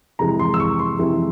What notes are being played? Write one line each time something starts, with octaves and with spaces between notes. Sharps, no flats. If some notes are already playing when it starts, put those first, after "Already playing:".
F2 C3 E3 G#3 E4 A#5
C6
E6
C#6
C6
F2 C3 E3 G#3 E4